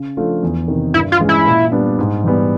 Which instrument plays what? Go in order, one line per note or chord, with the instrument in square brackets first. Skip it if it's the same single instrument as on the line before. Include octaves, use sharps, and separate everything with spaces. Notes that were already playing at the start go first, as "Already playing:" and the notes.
Already playing: [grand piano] C#3
F3 A3 D4 F4
E2
C3 D#3
[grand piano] G2 [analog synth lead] E4
[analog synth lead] F4
[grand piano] E3 G#3 C#4
[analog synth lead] E4
[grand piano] A#2
G3 B3 D4
G#2
E3 G3 B3